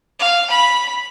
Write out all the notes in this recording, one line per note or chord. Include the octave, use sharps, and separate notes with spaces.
F5
B5